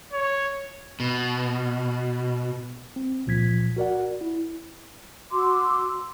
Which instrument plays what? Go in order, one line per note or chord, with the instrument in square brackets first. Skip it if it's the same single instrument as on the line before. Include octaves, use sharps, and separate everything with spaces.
[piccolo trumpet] C#5
[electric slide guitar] B2
[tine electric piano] C4
C#2 A#2 F3 G#6 B6
F#4 A#4 D5 F#5
E4
[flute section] F#4 C6 D6 E6